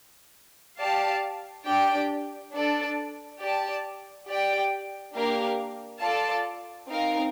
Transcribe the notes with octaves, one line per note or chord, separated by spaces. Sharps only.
G4 D5 F5 A5
D4 G4 D5 G5
D4 A4 D5
G4 D5 A5
G4 D5 G5
A#3 D4 G4 A#4 F5
F4 A4 D5 F5 A5
C4 D#4 A#4 F5